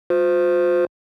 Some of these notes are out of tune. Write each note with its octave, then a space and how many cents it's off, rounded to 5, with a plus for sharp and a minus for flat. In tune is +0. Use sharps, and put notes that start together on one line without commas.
F4 +40 C5 -20